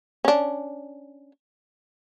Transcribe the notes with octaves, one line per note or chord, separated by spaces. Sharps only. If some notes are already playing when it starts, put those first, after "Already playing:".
C#4 D4